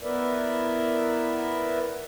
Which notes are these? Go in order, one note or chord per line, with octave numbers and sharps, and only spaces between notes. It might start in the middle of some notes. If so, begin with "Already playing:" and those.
B3 E4 A#4 B4 D5 E5